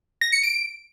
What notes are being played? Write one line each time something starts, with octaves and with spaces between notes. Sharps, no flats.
A#6
C#7
D7